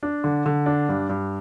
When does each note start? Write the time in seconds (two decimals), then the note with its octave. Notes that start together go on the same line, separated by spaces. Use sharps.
0.03 D4
0.24 D3
0.46 D3
0.66 D4
0.89 G2
1.09 G2